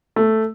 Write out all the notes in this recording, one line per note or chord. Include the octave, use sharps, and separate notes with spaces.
A3